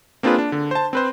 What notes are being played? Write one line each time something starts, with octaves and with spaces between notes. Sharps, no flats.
A#3 C4 D4 F4 G#4 B4
D4
D3
C5 A5
C4 B4 C5